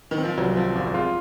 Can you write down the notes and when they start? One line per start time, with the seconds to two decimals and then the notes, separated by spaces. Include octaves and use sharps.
0.11 D#3
0.18 C4
0.24 F3
0.37 C2 F#3
0.56 F3 C4
0.75 G#1 F3
0.94 G#3 F4